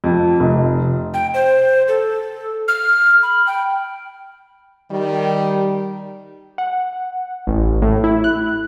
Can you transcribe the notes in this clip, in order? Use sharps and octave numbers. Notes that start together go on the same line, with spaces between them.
F2
F1
G5
C5
A4
F6
B5
G5
D#3 G3
F#5
A1
A2
E4
F#6